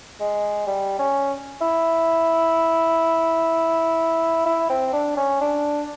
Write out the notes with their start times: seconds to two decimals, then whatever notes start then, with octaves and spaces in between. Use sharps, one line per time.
0.20 G#3
0.67 G3
0.99 C#4
1.61 E4
4.46 E4
4.69 C4
4.93 D4
5.16 C#4
5.41 D4